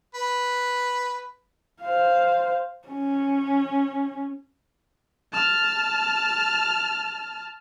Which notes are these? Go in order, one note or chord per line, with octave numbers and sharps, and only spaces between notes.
B4
C5 F5
C#4
A5 F6